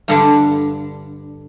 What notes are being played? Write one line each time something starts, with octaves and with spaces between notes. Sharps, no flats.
G2 D3 D4